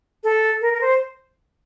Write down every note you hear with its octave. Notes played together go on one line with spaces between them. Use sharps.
A4
A#4
A#4
C5